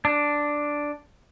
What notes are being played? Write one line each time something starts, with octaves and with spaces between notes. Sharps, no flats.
D4